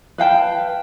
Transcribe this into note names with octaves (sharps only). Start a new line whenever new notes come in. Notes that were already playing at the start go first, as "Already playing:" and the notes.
B4 F5 G5 A5